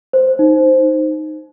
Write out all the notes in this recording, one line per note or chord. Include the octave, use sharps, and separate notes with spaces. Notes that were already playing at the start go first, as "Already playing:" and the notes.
C5
D#4